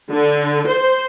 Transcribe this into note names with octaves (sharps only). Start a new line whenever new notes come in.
D3
C5